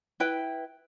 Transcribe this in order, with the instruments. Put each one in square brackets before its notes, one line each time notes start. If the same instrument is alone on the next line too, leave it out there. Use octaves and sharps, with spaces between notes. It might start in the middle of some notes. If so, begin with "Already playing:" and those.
[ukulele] E4 B4 G5